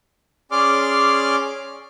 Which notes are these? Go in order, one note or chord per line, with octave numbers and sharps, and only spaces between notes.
C#4 G#4 D5 C6 D6 F6